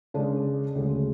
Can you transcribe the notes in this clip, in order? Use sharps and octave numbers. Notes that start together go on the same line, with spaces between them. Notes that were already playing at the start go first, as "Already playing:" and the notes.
C#3 G#3 D4
D2 C#3 G#3